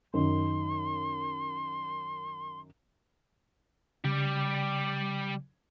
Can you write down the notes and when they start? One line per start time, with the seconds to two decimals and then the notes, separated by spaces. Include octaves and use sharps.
0.14 F#2 D#3 C6
4.04 C#3 G3 G4